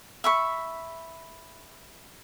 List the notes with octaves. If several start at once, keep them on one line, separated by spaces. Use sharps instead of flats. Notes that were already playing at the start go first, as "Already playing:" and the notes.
E5 B5 C#6